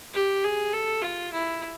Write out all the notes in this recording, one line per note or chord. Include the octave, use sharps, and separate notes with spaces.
G4
G#4
A4
F4
E4